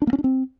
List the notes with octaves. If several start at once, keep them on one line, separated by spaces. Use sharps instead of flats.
D4
A#3
C#4
D4
C4